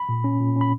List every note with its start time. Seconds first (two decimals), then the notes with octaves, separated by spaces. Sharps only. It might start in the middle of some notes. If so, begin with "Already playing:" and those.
Already playing: B5
0.09 A#2
0.24 C#4
0.40 A#2
0.56 C#4
0.61 B5